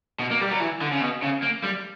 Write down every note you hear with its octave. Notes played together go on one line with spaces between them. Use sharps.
B2
A#3
G3
F#3
E3
D3
C#3
B2
C#3
A#3
G3